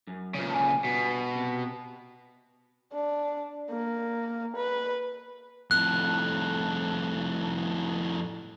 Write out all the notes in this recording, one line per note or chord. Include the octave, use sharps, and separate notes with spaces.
F#2
A#2 C#3
G#5 A5
G2 B2
C3
D4
A#3
B4
F2 A2 F#6